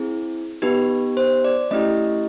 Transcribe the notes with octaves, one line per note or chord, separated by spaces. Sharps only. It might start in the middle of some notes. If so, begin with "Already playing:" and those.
Already playing: C4 E4 G#4
B3 D#4 G4 B4
C5
D5
A3 C#4 E4 G4 D#5